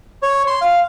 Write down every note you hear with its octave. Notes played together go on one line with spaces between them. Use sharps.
C#5
C6
F5